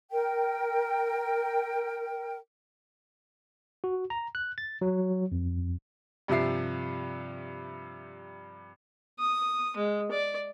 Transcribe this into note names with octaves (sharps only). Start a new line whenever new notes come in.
A#4 G5
F#4
A#5
F#6
A6
F#3
F2
G2 C3 F3 E5 C7
D#6
G#3
D5